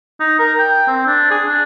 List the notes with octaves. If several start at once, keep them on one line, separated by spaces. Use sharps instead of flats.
D#4
A#4
G5
C4
D4
G#4
D4